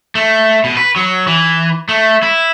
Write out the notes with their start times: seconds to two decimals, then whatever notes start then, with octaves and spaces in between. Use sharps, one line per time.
0.15 A3
0.64 B2
0.77 B4
0.96 F#3
1.27 E3
1.89 A3
2.23 E4